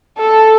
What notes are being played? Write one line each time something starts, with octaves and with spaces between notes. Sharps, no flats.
A4